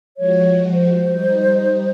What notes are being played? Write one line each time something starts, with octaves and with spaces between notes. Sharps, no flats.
F3 G#3 F#4 C#5
C5
G3 D#4